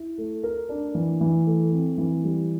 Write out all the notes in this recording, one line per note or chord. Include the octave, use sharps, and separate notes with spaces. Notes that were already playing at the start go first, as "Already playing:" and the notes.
Already playing: E4
A3
A#4
D4
E3
E3
A3
C4
E3
G3